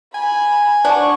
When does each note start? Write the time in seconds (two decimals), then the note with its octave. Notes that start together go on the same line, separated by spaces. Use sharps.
0.15 G#5 B5
0.85 D4 F#5 C#6